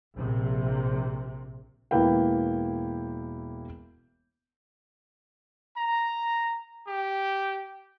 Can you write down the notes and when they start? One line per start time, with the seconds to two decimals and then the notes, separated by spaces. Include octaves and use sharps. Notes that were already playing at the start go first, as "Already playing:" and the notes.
0.15 A#1 C3
1.91 E1 E3 A#3 E4 B4 G5
5.77 A#5
6.87 G4